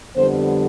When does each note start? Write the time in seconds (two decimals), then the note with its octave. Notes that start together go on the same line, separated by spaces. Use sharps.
0.14 F2 D3 G3 B3 C5